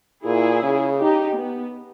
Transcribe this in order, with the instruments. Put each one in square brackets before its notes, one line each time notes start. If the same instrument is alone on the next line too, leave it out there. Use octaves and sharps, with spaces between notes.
[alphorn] A#2 [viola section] E4 G#4
[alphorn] C#3
[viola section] D#4 G4
B3